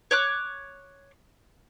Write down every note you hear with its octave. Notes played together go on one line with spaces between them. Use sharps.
C#5 D6 F#6